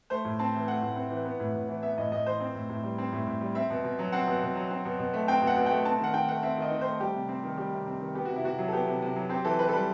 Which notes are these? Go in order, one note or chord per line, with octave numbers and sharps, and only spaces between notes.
A3 C5
A2
C4 A5
E3
A3 F#5
A2
C4
E3
B3
A2
A2
E3
B3 E5
A2 D#5
A2 D#5
E3 C5
C4
A2
A2
G3
C4
A2
A2
G3
C4 E5
B2
B2
F#3
C4 F#5
B2
B2
F#3
C4
B2
B2
A3
C4 G5
B2
F#5
B2
A3 G5
C4 A5
D#3 F#5
D#3 G5
A3 F#5
C4 E5
D#3 D#5
D#3
A3 C5
G3 G4
C3
C4
D#3
G3 G4
C3
C4
D#3
B3 G4
C3 F#4
E4
C3 F#4
F#3
A4
B3 G4
C3
C3
F#3
C4 G4
E3 A4
E3 B4
A4
G3 B4